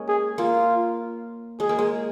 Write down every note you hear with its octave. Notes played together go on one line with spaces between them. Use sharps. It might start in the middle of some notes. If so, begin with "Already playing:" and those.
Already playing: G#3 A#3 C#4
G#4
A#3 F4
G#3 G#4
A#3
G#3